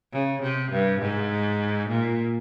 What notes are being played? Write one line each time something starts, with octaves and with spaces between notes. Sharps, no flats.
C#3
C3
G2
G#2
A#2